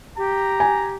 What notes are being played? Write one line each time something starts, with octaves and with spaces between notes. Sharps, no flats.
G4 A#5
G#5